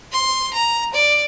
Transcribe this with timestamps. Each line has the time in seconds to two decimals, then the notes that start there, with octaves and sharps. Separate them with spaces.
0.12 C6
0.53 A#5
0.94 D5